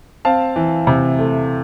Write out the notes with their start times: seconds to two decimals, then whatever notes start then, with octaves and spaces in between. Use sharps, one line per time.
0.25 C4 F5 A5
0.56 E3
0.87 C3
1.19 A3